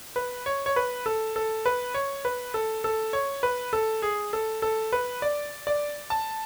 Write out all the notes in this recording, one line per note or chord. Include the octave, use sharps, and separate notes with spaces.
B4
C#5
C#5
B4
A4
A4
B4
C#5
B4
A4
A4
C#5
B4
A4
G#4
A4
A4
B4
D5
D5
A5